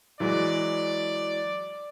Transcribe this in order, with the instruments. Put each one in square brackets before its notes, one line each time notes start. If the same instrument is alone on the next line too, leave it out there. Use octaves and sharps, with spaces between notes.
[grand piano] E3 F#3 G#3 [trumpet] D5